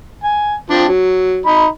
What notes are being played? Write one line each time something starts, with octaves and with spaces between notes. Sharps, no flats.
G#5
F3 C4 D4
F#3
D#4 B5